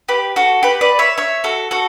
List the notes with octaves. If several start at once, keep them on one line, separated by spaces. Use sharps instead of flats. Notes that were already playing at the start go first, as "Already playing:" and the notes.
G4 B4
F#4 A4
G4 B4
B4 D5
C#5 E5
C#5 E5
F#4 A4
F#4 A4